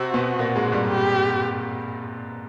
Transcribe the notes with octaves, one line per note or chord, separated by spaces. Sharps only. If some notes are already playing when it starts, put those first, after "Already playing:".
Already playing: C3 C4 F#4
B2 B3
A#2 A#3
G#2 G#3
G2 G3
G4